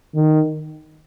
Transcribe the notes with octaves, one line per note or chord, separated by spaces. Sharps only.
D#3